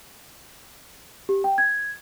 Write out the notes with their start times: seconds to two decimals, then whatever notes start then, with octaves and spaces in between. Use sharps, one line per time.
1.29 G4
1.44 G5
1.58 G#6